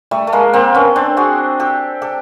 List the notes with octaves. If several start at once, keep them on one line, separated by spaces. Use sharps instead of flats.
G3 A3
A3
G#3 A#3
A#3 C4
B3 C#4
C4 D4
F#4 G#4
G4 A4
G4 A4